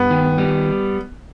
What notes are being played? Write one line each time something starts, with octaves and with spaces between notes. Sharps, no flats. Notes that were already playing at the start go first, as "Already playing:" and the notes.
Already playing: G2 B3
D#3
G3